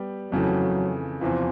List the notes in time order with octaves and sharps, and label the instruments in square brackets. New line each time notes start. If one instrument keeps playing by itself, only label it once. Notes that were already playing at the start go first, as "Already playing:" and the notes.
Already playing: [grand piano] G3 B3 G4
[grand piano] F2 C#3 E3 A3 [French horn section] F#3
[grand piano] E2 C3 E3 [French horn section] F3